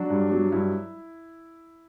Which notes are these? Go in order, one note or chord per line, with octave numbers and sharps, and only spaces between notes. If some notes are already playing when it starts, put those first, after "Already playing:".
Already playing: F#3 D4 F#4
G2
F#3
G2 E4